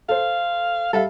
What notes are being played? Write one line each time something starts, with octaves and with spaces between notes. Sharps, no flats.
A4 C5 F5
G3 A4 E5 F5